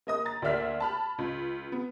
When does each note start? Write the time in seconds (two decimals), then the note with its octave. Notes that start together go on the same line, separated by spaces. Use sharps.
0.07 A#3 D#5 D#6
0.25 A#5 A6
0.42 D2 A#3 D5 E5 F6 B6
0.80 A5 B5 F6
1.18 C#2
1.72 B3